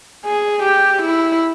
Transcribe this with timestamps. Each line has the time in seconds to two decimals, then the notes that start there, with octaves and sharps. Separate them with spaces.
0.25 G#4
0.63 G4
1.02 E4